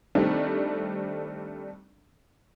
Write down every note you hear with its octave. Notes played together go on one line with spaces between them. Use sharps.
D#3 G3 A3 C4 D4